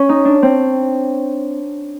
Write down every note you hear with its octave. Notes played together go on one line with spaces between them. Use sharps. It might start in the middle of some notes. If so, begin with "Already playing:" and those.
Already playing: C#4
D#4
D4
C4